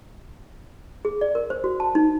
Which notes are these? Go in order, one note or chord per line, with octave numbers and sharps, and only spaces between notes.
G#4
D5
A#4
C5
F#4
A5
D#4